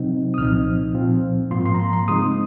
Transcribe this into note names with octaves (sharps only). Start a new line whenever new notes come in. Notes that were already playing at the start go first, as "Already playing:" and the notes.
Already playing: C3 F#3 C4 D#4
D#6
C2 A#2 F3 C4 D#4 F6
A#2 F3 C4 F4
G#2 F3 A#3 F4 C6
C6
A#5
C6
C6
C#3 G#3 C4 D#4 D#6